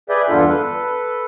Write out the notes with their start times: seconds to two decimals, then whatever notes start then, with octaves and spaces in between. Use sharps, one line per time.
0.09 G#4 B4 D5 E5 G5
0.29 E2 G2 D3 D4 F4 A4
0.48 A4 B4